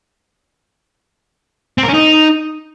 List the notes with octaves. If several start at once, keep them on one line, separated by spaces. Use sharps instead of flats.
C4
A#4
C#4
D#4